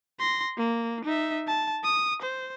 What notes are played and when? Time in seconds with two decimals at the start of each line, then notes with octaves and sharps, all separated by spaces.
0.19 C6 A#6
0.57 A#3
1.05 D#4 E5
1.47 A5
1.84 D#6
2.22 C5